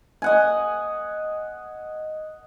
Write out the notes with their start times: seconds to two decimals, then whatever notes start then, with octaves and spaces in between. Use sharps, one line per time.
0.22 D#5 F#5 G#5